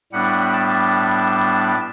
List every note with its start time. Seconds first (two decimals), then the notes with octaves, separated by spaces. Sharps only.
0.12 A2 G3 B3 D4 F#5
0.53 A5